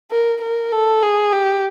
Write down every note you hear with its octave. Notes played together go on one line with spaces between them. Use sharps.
A#4
A#4
A4
G#4
G4